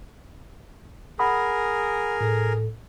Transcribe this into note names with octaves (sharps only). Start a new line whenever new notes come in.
G#4 A#4 F#5 B5 D#6
A2 A4